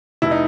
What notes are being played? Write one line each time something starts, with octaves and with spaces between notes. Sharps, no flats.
F1 E4
D#4